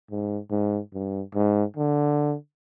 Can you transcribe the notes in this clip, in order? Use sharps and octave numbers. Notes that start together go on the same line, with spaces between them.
G#2
G#2
G2
G#2
D3